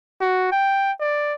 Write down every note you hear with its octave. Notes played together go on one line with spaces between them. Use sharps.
F#4
G5
D5